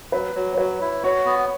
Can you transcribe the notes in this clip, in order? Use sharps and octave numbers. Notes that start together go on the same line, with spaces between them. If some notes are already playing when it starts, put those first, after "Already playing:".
F#3 B4
F#3
C#5
F#3 B4
E4
F#4 C#5
B3